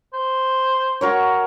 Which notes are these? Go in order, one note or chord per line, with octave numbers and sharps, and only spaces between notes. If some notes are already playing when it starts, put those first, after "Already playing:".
C5
F#4 A#4 C#5